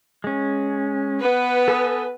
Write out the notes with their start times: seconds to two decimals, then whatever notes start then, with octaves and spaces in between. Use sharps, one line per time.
0.24 G#3 C#4
1.20 B3 B4
1.68 A4 G#5 D#6